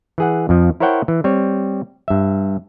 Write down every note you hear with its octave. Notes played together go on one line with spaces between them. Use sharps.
E3 G#4 F#5
F2 F3
E4 A#4 C5 C#5 F#5 G5
E3
G3 C4 C#5
G2 E5